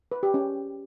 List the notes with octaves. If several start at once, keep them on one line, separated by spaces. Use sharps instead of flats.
B4
G4
C#4